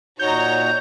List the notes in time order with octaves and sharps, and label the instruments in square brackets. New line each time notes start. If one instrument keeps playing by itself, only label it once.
[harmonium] A#2 D#4 F#4 [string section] C#5 A#5 [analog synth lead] G6